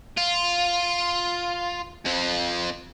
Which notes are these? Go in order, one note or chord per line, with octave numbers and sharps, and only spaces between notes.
F4
F2 F3